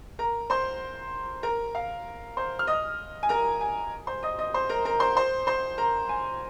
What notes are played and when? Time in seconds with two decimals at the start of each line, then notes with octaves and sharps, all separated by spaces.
0.19 A#4 A#5
0.50 C5 C6
1.43 A#4 A#5
1.75 F5
2.37 C5 C6
2.59 F6
2.67 D#5 D#6
3.23 G#5
3.29 A#4 A#5
3.61 G#5
4.07 C5 C6
4.23 D#5 D#6
4.39 D#5 D#6
4.54 C5 C6
4.69 A#4 A#5
4.85 A#4 A#5
5.00 C5 C6
5.17 C5 C6
5.47 C5 C6
5.78 A#4 A#5
6.09 G#5